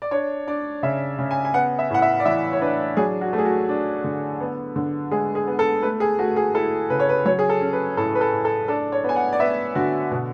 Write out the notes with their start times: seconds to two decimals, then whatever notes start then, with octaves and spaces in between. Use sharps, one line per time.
0.02 D5
0.11 D4 C#5
0.47 D4 D5
0.83 C#3 E5
1.19 C#3
1.31 G#5
1.45 G#5
1.54 B3 F#5
1.79 E5
1.90 A2 F#5
2.02 E5
2.20 D5
2.25 E3 E5
2.53 C#5
2.61 D4 B4
2.97 F#3 G#4
3.21 F#4
3.33 A3
3.38 G#4
3.45 F#4
3.69 D4
4.04 D3
4.40 B3
4.76 D3
5.11 G#3 G#4
5.35 G#4
5.47 B3
5.59 A4
5.82 A3 B4
6.00 G#4
6.19 A3 F#4
6.36 G#4
6.55 E4 A4
6.90 C#3 B4
7.00 C#5
7.09 B4
7.25 F#3 C#5
7.39 G#4
7.49 A4
7.62 C#4
7.73 B4
7.97 A2 A4
8.15 B4
8.21 A4
8.33 A2
8.45 A4
8.68 D4 A4
8.92 C#5
9.04 B3 G#5
9.16 F#5
9.33 D5
9.40 B3 E5
9.75 D3 F#4
10.11 B2